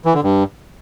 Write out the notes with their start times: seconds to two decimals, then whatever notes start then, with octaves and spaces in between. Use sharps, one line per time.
0.05 E3
0.14 D3
0.23 G2